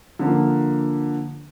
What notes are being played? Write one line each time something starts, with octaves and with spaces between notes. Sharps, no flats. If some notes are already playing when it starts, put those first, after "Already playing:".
D3 F3 A#3